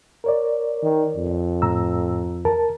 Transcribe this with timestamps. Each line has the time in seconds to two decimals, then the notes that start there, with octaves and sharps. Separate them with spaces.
0.24 A#4 C#5 D5
0.82 D#3
1.16 F2
1.62 A2 A#5 E6
2.45 D#2 A#4 A5